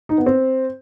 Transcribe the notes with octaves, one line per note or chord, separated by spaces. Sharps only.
D#4
B3
C4